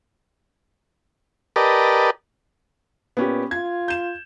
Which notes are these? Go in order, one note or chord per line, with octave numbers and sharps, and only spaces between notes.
G4 A#4 B4 D5 D#5 A5
A#2 B3 C#4 G4
F4 G#6
G6 E7